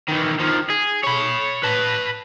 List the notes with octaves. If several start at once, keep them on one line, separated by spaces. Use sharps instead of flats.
D#3 E3
D#3 F3
G#4
C#5 B5
B4 A5